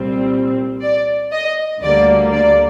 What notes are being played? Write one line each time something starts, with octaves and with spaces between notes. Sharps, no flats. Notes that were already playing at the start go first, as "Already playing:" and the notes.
Already playing: C2 A#2 G3 C4
D5
D#5
D2 D3 G3 A#3 D5
D5